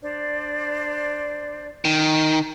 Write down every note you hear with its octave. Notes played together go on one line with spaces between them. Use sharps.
D4 C5 D5
D#3